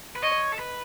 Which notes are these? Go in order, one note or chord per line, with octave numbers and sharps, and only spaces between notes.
B4
C#5 D#5
A4
B4